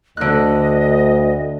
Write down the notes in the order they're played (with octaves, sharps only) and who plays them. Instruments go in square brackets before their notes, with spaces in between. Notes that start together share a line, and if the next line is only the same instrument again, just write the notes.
[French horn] D2 [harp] D3 F#6 [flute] D#5